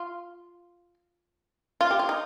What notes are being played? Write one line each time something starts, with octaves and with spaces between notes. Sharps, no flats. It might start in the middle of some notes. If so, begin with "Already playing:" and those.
Already playing: F4
F4
G4
F4
D#4